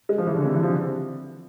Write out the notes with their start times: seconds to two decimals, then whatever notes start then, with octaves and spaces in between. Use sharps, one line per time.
0.09 G#3
0.18 F3
0.27 E3
0.36 D3
0.45 C3
0.54 E3
0.63 F3